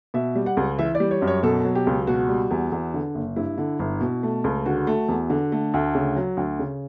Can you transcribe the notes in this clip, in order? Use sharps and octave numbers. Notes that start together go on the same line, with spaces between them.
B2 E5
G3
F#5
C#2
E3 E5
D5
G3
C#5
F#2
C#5
B2 A4
F#3
G4
C#2
B2 F#4
G3
E2
E2
D3
F#1
G2 E4
D3
G1
B2
A3
C#2
D3 F#4
A3
E2
D3
A3
D2
C#3
F#3
D2
C#3